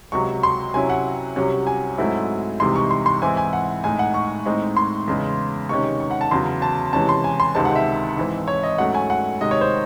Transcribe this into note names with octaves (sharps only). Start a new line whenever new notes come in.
C#2 C3 F#3 C#6
C6
C3 F#3 C#4 E4 G#5
F#5
C2 C3 F#3 C#4
G#5
G#2 F#3 A3 C4 E4
C2 C3 E3 G#3 D#4 C6
C#6
C6
C6
G#2 E3 C4 E4 G#5
G#5
F#5
A2 G#3 D#4 G#5
F#5
C#6
A2 G#3 C4 D#4
C6
E2 C#3 G#3
C3 D#3 G#3 C#4 C#6
C#6
F#5
A5
E2 C#3 F#3 C6
A5
C3 E3 G#3 C#4 A5
C6
G#5
C6
C#2 C3 D#3 G#3 C4 A5
F#5
E5
G#2 E3 C4
C#5
D#5
G#2 F#3 A3 C#4 F#5
G#5
F#5
C3 D#3 G#3 D#5
C#5
C5